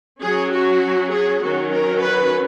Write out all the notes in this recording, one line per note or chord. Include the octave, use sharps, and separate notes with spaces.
F#3 C#4 G#4
F#4
G#4
D#3 F#3 C#4 F#4
A#4
B4